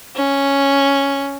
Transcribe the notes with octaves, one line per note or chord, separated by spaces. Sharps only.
C#4